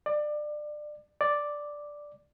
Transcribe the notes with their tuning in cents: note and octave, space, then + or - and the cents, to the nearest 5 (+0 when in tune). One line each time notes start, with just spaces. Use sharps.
D5 +25
D5 +0